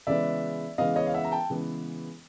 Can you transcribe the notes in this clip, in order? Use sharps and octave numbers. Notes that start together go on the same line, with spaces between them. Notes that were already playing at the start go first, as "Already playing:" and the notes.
C#3 E3 G#3 B3 D5 E5
C#3 E3 G#3 B3 D#5 F5
C#5 D#5
F5
E5 F#5
A#5
G5 A5
C#3 E3 G#3 B3